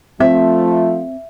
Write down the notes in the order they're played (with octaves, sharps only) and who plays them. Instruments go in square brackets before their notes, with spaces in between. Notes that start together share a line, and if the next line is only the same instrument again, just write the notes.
[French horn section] F3 A3 F4 [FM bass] C4 [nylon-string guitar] E5